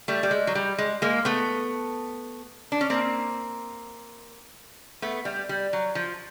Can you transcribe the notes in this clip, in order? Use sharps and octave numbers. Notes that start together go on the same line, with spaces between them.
G3 A3
G3
G#3
F#3
G3
G#3
G#3 A#3
A3 B3
D4
C#4
A#3 C4
A3 B3
G3
G3
F#3
F3